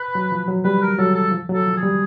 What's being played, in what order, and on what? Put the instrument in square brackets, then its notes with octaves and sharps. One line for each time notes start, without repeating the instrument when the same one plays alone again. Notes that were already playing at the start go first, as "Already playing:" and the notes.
Already playing: [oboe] B4
[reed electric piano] F#3
F3
F#3
[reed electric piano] G3 [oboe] B4
[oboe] A#4
[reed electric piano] F#3 [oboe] A4
[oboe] A4
[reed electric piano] F3
F#3
[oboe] A4
[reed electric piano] F3
[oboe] G#4
[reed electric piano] G3